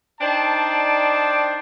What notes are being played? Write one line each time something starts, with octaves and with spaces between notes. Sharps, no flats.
D4 D#4 C5 D5 G5 A5